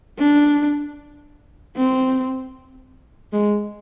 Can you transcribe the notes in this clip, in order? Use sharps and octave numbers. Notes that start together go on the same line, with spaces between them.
D4
C4
G#3